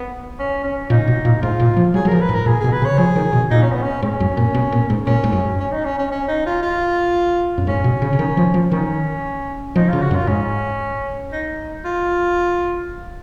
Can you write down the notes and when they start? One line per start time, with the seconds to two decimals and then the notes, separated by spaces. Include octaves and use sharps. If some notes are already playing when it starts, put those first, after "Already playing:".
Already playing: B3
0.39 C#4
0.64 C#4
0.90 A#2 D#4
1.07 B2
1.25 A#2
1.42 G#2 F4
1.60 A#2
1.76 F3
1.94 F#3 G#4
2.05 F#3
2.08 F3 A#4
2.21 B4
2.29 G#2
2.34 A#4
2.46 A#2 G#4
2.60 B2 G#4
2.72 B4
2.82 C#3
2.85 C#5
2.98 F3 G#4
3.16 D#3
3.33 B2
3.51 A#2 D#4
3.62 C#4
3.72 B3
3.83 C#4
4.02 G#2 C#4
4.20 F#2
4.37 A#2
4.54 B2
4.72 A#2
4.90 G#2
5.06 A#2 C#4
5.24 G#2
5.32 F#2
5.60 C#4
5.72 D#4
5.85 C#4
5.98 C#4
6.11 C#4
6.28 D#4
6.46 F4
6.63 F4
7.58 F#2
7.67 G#2 C#4
7.84 B2
8.02 C#3
8.13 C#3
8.19 D#3
8.37 F3
8.54 F3
8.71 D#3 C#4
9.76 F3 D#4
9.89 C#3 F4
10.02 F#4
10.11 F#2
10.15 F4
10.27 G#2 C#4
11.32 D#4
11.85 F4